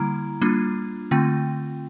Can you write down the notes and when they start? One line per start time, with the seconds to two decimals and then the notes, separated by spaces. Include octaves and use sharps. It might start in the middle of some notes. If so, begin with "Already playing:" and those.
Already playing: D3 G3 A#3 E4 A#5
0.41 G3 A#3 D4 F4
1.11 D3 A3 C4 F4 G5